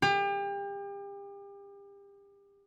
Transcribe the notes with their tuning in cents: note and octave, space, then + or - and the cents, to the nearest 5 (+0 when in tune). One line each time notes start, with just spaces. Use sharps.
G4 +35